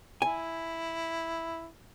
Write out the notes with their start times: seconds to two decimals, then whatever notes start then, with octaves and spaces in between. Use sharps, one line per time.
0.22 E4 G#5